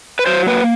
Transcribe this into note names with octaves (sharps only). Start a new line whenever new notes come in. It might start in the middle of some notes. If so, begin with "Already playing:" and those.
B4
F#3 C5
A#3 B4